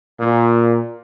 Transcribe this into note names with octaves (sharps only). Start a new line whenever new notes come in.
A#2